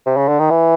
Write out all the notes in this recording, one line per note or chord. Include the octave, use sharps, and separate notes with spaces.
C3
C#3
D3
D#3
E3